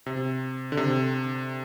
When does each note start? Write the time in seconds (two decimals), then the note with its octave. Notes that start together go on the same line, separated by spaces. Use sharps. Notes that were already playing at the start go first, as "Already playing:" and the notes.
0.06 C3
0.72 D3
0.77 C3